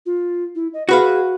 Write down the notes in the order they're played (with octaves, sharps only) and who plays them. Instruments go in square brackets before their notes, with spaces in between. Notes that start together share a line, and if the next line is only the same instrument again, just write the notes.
[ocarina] F4
E4
D#5
[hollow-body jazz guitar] F#4 B4 F5 [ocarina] G#4